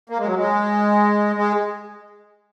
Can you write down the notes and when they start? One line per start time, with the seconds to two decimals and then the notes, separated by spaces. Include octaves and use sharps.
0.10 A#3
0.19 G#3
0.26 F#3
0.36 G#3
1.36 G#3